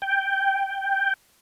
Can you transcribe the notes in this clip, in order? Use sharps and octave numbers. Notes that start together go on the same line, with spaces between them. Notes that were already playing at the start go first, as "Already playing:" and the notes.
G5